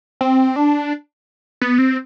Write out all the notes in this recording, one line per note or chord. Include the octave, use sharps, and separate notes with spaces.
C4
D4
B3
C4